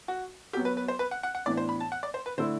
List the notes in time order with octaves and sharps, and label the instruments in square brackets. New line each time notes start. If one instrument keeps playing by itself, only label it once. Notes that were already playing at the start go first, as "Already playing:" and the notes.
[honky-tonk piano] F#4
[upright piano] F#3 B3 F#4 [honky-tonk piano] G4
[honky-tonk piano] B4
B4
C5
B4
F#5
F#5
F#5
[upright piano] A2 E3 B3 D4 [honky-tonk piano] D5
[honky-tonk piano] C5
B5
A5
F#5
D5
C5
B4
[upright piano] D3 A3 E4 [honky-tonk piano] C5